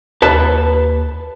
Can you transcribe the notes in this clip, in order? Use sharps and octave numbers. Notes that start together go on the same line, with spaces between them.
D#2 B4 A5